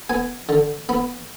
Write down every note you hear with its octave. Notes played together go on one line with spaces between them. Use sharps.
B3 G#5
D3
B3 B5